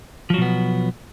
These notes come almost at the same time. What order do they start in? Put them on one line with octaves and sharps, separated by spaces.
F3 F#3 B2 B3